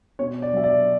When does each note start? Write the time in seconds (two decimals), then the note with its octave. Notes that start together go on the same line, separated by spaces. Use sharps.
0.19 B2 C#5
0.42 D5
0.54 F#3 E5
0.64 D5